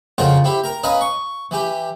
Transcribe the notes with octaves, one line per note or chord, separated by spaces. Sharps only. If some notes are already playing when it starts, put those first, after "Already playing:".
F2 C#3 F4 A#4 C5 F#5
C4 E4 G4
A#4 A#5
C#4 B4 D#5 F5 A#5
C#6
E3 G4